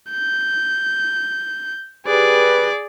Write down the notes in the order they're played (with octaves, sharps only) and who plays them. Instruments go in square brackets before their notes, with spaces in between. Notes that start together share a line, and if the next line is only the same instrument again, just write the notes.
[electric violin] G6
[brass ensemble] G4 B4 [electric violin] G#4 D5